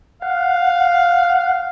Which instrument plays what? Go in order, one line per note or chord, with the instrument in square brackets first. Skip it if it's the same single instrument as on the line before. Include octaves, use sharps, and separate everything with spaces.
[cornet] F5 [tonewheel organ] F#5